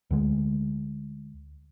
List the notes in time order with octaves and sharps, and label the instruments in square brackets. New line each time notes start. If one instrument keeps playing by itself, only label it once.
[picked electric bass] D2 D3 G#3